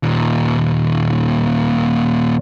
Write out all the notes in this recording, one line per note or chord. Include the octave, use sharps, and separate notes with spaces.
D#2 A#2